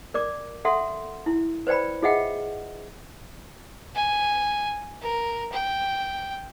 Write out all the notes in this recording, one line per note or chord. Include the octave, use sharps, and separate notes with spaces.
A#4 D5 D6
A4 E5 F#5 C6
E4
B4 C5 D5 G5 B5
F4 G#4 D#5 E5 F#5 G5
G#5
A#4
G5